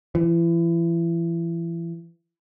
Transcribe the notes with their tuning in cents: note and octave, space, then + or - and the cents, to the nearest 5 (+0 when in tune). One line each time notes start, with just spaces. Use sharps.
E3 +30